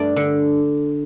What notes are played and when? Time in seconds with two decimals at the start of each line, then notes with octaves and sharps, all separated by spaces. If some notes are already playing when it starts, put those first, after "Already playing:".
Already playing: G2 A3 D5
0.16 D3